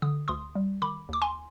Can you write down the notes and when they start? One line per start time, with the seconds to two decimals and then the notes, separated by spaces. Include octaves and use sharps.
0.02 D3 D#6
0.28 D2 C6 D#6
0.55 G3
0.82 D#3 B5 D6
1.09 D#2 D6
1.22 G#5 C6